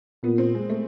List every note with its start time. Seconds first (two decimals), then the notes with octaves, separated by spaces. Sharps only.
0.23 A#2 B3
0.38 C4
0.55 G#3
0.70 A3